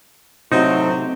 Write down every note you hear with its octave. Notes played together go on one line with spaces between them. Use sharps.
A2 C3 F#3 C4 D#4